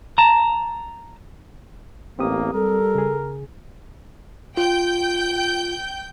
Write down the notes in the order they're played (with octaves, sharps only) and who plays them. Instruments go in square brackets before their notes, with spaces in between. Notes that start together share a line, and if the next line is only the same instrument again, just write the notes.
[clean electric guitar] A5 A#5
[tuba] A1 [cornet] A#3 [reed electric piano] C4 G4 D#6
[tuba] G3 [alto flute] A4 [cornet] A#4
[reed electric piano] C#3 G#4
[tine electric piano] F4 [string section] G5 G6